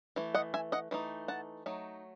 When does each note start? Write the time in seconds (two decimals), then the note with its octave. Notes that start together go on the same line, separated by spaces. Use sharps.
0.16 E3 A3
0.35 D#5 F#5
0.54 E5 G#5
0.72 D#5 F#5
0.91 E3 A3 D#4
1.28 F#5 A5
1.66 F#3 A3 D#4